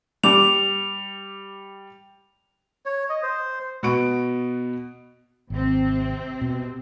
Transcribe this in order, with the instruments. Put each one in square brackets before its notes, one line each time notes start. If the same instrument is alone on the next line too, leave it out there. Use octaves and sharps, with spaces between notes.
[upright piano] G3 D6 [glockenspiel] F7
[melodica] C#5
D#5
C5
[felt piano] B2 B3 F#4 C#6 D7
[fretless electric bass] G#1 [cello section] C3 C4
[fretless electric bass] B2